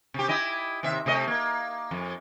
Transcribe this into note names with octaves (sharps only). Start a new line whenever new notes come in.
C3 G4
E4 G4 D#5
D#2 C3 E5
C3 A3 D#5
A#3
F2